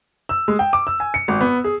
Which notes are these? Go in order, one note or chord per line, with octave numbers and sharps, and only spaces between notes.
E6
G#3
G5
D6
E6
G#5
C#7
G#1
B3
G#4